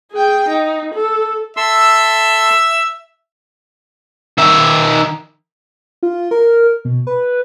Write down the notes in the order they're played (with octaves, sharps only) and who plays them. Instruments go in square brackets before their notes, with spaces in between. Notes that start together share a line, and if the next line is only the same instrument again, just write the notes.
[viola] G#4 G5
D#4
A4
[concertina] A4 C6 E6 [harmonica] E5
[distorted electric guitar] D#3 E5
[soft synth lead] F4
A#4
B2
B4